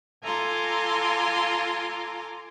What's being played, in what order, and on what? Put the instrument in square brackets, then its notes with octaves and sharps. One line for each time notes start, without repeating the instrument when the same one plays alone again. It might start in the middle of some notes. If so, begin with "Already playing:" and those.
[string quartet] F4 A4 G#5 A#5 C6 D6